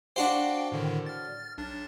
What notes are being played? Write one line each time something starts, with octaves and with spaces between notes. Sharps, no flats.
D4 F#4 C5 F5 G5
A2 D3 D#3
F6 A6
B1 D4 A6